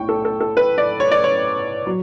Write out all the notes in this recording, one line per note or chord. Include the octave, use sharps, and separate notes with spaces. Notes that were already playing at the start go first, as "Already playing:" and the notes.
Already playing: B1 A2 G5 C#6
A4
A4
A4
B4
D5
C#5
D5
C#5
F#3